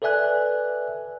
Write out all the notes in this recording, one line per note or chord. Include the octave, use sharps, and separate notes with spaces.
A4 B4 D5 E5 G#5 F#6